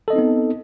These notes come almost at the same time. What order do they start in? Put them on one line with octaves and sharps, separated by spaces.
A4 D#5 C4 D#4 B3